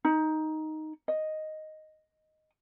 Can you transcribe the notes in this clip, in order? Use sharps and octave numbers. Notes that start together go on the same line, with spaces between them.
D#4
D#5